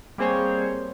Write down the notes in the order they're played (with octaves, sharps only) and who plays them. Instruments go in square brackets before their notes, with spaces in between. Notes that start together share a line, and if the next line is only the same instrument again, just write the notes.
[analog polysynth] G3 A#3 C4 G#4 C5 C#5